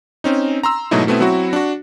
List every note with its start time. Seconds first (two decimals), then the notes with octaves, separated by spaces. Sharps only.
0.24 C4 C#4 D#4
0.63 A#5 C6 E6
0.91 G#2 B2 F#3 A3 D#4 E4
1.07 B2 A3 B3 C4 E4
1.20 F#3 C4 E4 F#4
1.53 D4 F#4